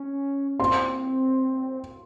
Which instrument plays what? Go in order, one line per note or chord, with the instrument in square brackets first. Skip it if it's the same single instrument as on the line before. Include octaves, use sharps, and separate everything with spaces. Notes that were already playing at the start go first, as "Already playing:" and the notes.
Already playing: [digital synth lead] C#4
[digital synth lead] C4 [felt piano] C6